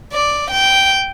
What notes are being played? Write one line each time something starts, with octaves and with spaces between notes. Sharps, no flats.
D5
G5